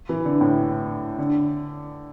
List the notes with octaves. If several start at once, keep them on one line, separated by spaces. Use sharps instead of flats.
E3
D3
A2
D3